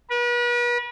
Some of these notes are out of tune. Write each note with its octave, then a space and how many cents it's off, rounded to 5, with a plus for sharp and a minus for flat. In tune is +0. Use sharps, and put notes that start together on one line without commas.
B4 -40